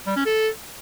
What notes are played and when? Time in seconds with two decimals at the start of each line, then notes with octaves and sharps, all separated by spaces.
0.07 G3
0.16 C#4
0.26 A4